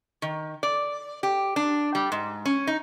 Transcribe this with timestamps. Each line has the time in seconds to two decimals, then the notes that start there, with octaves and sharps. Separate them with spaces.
0.22 D#3
0.63 D5
1.23 G4
1.56 D4
1.95 G3
2.12 G#2
2.45 C#4
2.67 D#4